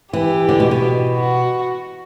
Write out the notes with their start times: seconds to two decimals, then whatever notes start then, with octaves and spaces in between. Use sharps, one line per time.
0.13 E3 G4
0.49 D3
0.60 B2
0.71 B2
1.16 F#4